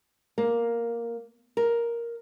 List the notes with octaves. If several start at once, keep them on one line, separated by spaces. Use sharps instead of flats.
A#3
A#4